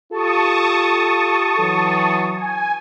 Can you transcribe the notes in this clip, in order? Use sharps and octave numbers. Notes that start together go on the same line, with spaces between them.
F4 G4 A4 A5 C#6 D#6
E3 F#3
G#5